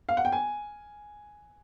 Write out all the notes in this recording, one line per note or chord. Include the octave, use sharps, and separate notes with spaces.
F5
F#5
G5
G#5